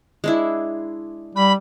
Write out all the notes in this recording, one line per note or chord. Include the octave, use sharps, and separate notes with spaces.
G#3 D4 E4
G3 B5